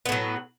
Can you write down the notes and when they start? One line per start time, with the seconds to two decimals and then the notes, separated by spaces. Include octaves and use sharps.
0.06 B3
0.09 A2
0.12 F#3